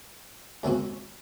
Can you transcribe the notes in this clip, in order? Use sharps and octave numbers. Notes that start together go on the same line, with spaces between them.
D#2 C#3 G#3 C4 F#4